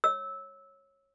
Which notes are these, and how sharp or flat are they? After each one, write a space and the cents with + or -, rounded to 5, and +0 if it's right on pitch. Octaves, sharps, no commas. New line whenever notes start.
C#5 -15 E6 -15